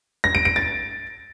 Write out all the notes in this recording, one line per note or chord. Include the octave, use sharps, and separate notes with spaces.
A#6
D7
D7
A6